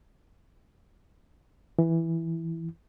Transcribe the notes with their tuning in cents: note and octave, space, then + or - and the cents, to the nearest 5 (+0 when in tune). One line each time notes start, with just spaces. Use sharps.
E3 +0 E4 -5